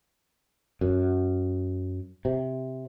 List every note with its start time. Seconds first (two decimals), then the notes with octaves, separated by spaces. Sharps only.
0.81 F#2
2.25 C3